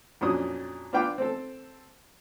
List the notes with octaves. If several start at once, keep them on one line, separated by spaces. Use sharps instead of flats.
F2 A#2 F#3 C#4 D4 D#6
D4 F4 B4 F5 G5 D6
C4 A4